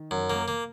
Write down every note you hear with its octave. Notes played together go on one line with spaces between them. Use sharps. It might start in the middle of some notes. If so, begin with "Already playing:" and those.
Already playing: D#3
F#2
A#3
A#3